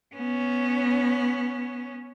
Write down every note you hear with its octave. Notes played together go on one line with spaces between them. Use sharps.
B3 C#4